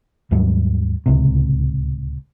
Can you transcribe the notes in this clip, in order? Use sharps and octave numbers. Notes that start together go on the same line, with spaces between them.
D#2 G#2 F#3 G3
D1 C#2 C3